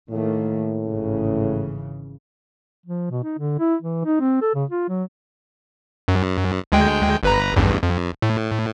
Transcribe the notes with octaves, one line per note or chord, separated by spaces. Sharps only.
A2 D#3 A3 A#3
G#1 C#3 E3
F3
B2
D#4
D3
E4
E3
D#4
C4
A4
C#3
F4
F#3
F#2
D2 G#3 G5
G1 B4 A#5
A1 E2 G2
F2
A2